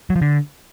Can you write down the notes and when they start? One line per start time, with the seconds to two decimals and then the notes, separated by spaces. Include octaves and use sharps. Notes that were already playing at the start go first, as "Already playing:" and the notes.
0.10 F#3
0.16 F3
0.21 D3